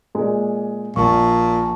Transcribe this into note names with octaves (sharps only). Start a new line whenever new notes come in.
A#2 G#3
A#1 A#2 A5 C#6